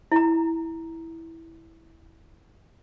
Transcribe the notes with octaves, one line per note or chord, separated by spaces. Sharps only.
E4 A#5